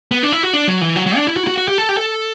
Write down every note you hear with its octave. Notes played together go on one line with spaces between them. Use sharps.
B3
D4
E4
F#4
D4
F#3
E3
F#3
F#3
D4
E4
F#4
E4
F#4
F#4
G4
A4
G4
A4